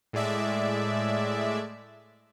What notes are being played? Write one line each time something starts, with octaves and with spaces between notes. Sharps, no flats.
A2 G#3 D5 E5